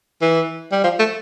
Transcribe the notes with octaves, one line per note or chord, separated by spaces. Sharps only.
E3
G3
F3
A3